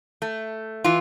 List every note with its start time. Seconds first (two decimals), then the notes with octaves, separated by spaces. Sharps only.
0.22 A3
0.84 E3 F4